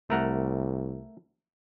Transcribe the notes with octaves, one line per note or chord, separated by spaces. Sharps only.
C2 A3 A#4 F#5